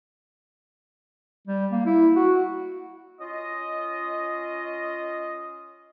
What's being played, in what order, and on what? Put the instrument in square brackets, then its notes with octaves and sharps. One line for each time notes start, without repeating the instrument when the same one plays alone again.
[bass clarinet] G3
A#3
E4
F#4
[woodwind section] C#4 F4 D#5